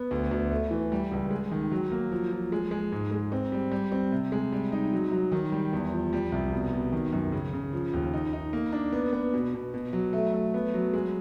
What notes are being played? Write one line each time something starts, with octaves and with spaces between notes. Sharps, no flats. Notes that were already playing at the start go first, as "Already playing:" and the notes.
Already playing: B3
D2
D2
A3
E3
G3
C#2
G#3
D#3
F#3
A#3
F3
F3
G#3
G#3
G#2
G#3
C4
G3
G3
C4
C3
G#3
G3
D#4
F#3
F#3
D#3
G3
E2
F3
G3
C2
B2
B2
D#3
F#2
C#3
C#3
F3
D#2
D#4
D#4
A#3
D4
B3
B3
B2
B2
B2
F#3
A3
A3
B3
F#3
G#3